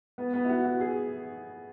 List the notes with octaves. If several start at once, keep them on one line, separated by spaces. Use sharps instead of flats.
B3
B3
E4
F#4
F#4
G#4